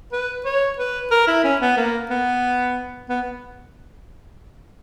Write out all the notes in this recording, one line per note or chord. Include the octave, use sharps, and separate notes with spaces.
B4
C#5
B4
A#4
E4
C#4
B3
A#3
B3
B3